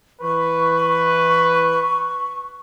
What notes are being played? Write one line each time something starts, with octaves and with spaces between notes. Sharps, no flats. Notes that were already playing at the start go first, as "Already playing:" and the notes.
E3 B4 C#6